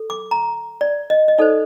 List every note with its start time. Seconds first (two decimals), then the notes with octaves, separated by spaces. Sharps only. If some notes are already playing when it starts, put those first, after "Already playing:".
Already playing: A4
0.10 D6
0.31 A#5
0.81 D5
1.10 D#5
1.28 D#5
1.38 D#4 A4 C5 D5